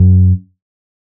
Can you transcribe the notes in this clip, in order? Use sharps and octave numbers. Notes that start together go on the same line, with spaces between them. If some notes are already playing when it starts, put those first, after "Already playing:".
Already playing: F#2